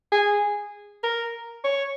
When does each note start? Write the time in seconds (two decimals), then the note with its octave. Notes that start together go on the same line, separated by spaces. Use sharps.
0.12 G#4
1.04 A#4
1.65 C#5